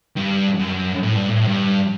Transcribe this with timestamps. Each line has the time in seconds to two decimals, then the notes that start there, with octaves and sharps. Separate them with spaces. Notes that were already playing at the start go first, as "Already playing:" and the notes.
0.16 G2
0.60 F#2
1.04 A2
1.17 G2
1.29 A2
1.48 G2